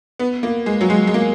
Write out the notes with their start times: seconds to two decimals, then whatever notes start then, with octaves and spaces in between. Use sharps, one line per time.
0.19 B3
0.43 A#3
0.66 G#3
0.81 F#3
0.90 G#3
1.07 G#3
1.14 A#3